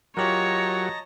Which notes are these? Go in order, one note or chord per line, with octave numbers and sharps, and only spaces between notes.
F#3 F4 G4 A#4 C#5 D#5 A5 A#5